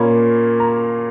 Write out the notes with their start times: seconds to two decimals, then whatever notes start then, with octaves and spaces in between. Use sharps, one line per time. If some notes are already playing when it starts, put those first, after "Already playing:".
Already playing: A#2 A#3 C#4 B5
0.60 A#5